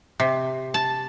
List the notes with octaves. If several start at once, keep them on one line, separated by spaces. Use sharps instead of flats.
C3
A5